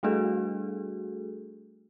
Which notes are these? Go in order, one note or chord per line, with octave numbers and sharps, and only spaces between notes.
G3 A3 D4 F#4 G#4 A4